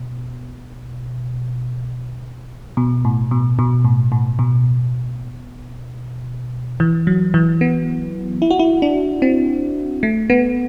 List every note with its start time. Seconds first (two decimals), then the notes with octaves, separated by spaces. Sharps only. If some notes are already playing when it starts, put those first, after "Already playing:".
Already playing: B2
2.77 B2
3.05 A2
3.31 B2
3.59 B2
3.84 A2
4.12 A2
4.39 B2
6.80 E3
7.07 F#3
7.34 E3
7.61 B3
8.42 E4
8.51 F#4
8.59 E4
8.82 D4
9.22 C4
10.03 A3
10.30 B3